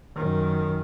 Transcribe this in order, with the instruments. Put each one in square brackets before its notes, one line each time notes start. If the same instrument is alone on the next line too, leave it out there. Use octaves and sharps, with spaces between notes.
[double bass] F#2 D#3